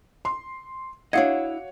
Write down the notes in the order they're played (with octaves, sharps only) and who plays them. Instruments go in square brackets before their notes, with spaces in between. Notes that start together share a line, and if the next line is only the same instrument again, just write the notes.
[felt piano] C6
[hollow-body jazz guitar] D4 E4 D#5 [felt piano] F#4 C#5 [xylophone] F5 F#5 G#6